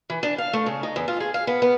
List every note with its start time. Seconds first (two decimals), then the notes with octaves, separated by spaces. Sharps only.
0.10 E3
0.23 D4
0.38 F5
0.53 A3
0.66 C#3
0.83 D#4
0.96 E2
1.08 F4
1.20 G#4
1.34 F5
1.47 B3
1.62 B3